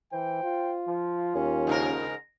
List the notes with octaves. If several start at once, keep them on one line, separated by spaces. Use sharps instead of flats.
E3 C5 G5
F4
F3
D#2 C#4
G#2 C#3 A#4